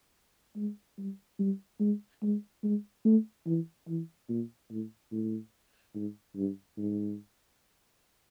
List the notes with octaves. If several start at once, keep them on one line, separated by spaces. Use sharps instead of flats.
G#3
G3
G3
G#3
G#3
G#3
A3
E3
E3
A#2
A2
A2
G#2
G2
G#2